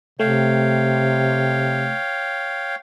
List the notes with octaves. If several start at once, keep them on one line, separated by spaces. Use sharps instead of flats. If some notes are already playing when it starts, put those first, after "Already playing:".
C3 A3 C#5 F5 G5